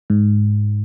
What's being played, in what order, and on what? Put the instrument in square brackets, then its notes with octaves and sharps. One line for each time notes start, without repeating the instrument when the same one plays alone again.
[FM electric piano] G#2